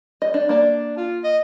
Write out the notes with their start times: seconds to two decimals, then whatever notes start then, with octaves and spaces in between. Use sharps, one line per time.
0.22 D#5
0.34 D4
0.49 A#3 D4 D5
0.97 F4
1.24 D#5